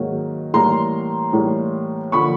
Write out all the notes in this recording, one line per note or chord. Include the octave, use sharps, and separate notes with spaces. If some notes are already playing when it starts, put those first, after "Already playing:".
Already playing: G#2 D#3 F#3 A#3
A2 E3 G3 A#3 A#5 C6
A2 E3 G3 A#3
D3 F3 A#3 B5 C#6